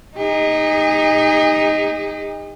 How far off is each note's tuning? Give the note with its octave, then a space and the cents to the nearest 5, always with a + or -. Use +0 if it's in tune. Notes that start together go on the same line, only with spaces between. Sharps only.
D#4 +0 G#4 -45